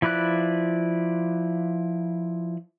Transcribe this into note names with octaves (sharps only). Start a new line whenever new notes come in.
F3 E4 B4 D5 F#6